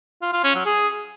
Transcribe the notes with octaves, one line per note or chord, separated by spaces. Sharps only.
F4
F4
C#4
F#3
G#4